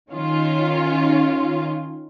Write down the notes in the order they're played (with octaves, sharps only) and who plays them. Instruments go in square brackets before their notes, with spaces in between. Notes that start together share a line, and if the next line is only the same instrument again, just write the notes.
[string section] D#3 C#4 F4